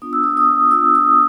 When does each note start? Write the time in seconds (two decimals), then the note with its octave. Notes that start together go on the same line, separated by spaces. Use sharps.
0.02 B3 D4 F4 D#6
0.13 E6
0.24 D#6
0.37 D#6
0.71 B3 D4 F4 E6
0.95 D#6